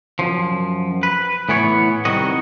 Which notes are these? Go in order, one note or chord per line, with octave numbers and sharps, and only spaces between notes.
F#2 F3
B4
A2 E3 B3 C#5
C2 D#3 F#4 D#5